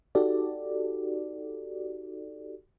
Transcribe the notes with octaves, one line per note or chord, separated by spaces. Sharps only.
D#4 F#4 G4 A4 D5